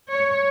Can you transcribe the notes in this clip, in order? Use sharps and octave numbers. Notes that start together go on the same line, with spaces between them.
C#5